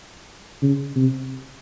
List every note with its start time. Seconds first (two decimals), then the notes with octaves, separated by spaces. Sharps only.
0.62 C#3
0.96 C3